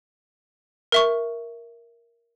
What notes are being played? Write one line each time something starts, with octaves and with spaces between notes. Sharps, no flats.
A#4 E5 C#6